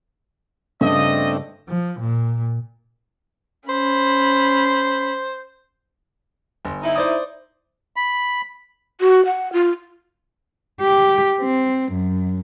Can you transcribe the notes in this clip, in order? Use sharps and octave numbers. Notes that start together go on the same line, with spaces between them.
G2 C#3 A3 C4 D4 D#5
F3
A#2
C#4 C5 B5
G1
D#4 E4
C5 D5 D#6
B5
F#4
F#5
F4
G4
C4
F#2